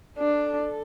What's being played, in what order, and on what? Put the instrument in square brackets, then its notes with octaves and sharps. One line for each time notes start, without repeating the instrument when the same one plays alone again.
[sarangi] D4 [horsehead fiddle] A4